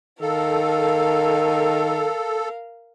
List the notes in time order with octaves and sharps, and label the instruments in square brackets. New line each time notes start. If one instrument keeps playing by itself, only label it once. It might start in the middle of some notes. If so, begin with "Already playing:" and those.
[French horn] D#3 [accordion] A4 [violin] A#4 F5